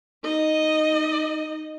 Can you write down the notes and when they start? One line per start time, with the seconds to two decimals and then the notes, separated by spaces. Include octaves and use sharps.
0.23 D#4 D#5